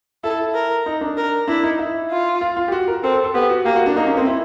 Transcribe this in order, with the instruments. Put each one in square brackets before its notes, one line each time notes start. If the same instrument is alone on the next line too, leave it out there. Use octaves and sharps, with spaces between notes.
[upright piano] E4 [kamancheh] A4
[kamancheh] A#4
[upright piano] D#4
D4
[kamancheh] A#4
[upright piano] D4 [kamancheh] E4
[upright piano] D#4
E4
[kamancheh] F4
[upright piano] F4
F4
G4
F#4
A#4
[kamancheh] C4 [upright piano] A4
[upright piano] A4
A4
[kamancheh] B3 [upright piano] G4
[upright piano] F#4
[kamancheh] A#3 [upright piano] G4
[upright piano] F#4
D4
[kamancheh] A#3 [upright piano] D#4
[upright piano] C#4
C4
E4